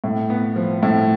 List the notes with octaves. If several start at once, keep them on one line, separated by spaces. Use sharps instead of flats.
A2
B3
F3
A2